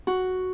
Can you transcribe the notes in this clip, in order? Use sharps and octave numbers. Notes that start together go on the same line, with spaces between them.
F#4